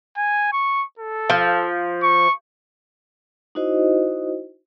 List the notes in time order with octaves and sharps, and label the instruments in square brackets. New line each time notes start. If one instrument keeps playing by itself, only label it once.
[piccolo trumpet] G#5
C#6
A4
[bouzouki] F3
[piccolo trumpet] C#6
[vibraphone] D#4 E4 F#4 C5 D#5